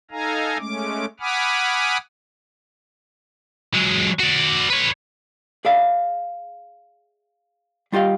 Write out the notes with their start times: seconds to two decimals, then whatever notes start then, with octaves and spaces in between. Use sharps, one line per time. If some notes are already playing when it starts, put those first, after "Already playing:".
0.11 D#4 A4 F5 G#5 A#5
0.58 G#3 A3 C#4 D6
1.20 F#5 G#5 B5 D6 D#6 F6
3.74 F#3 G#3
4.19 F#4 D5
4.70 B4 C#5
5.65 G#4 D5 E5 F5
7.92 G3 F4 G4 D#5 F5